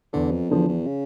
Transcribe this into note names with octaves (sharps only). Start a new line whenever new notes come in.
E2 D3
F2
E2 D3 F3
E2
C#3